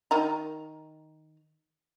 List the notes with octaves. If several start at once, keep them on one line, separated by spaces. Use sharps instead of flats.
D#3 D#4 A#5